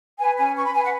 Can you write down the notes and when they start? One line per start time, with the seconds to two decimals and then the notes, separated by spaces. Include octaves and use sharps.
0.18 B4 G#5
0.37 C#4 G#5
0.55 B4 C#6
0.65 B5
0.74 B4 G#5
0.83 F#5